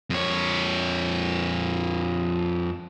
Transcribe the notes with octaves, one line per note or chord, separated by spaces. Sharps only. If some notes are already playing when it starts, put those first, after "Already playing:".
F2 C#5